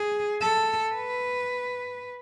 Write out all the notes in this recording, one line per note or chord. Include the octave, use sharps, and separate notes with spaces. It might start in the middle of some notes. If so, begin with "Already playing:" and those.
Already playing: G#4
A4
B4